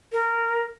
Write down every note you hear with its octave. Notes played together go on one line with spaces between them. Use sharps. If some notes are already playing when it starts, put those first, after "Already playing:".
A#4